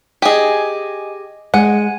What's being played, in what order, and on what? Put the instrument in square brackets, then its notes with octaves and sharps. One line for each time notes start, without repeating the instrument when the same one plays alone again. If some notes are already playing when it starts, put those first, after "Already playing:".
[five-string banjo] G4 G#4 [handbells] D#5 G#5
[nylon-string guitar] G#3 [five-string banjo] F#5 [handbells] G#5